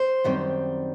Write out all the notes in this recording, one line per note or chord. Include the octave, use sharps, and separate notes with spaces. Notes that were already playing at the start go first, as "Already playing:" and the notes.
Already playing: C5
F#2 D#3 G3 C4